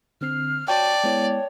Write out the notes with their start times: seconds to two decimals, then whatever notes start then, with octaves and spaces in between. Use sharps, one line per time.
0.21 D3 C4 F6 C7
0.68 F#4 C#5 D5 G5 A5
1.04 G#3 B3 E4 C#5